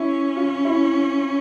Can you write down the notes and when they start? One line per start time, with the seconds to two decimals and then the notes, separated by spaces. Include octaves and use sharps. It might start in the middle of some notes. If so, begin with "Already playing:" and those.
Already playing: C#4 E4
0.36 F4
0.65 E4